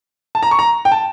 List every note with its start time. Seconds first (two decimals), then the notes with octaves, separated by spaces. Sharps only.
0.35 A5
0.43 A#5
0.51 C#6
0.59 A#5
0.85 G5
0.92 A5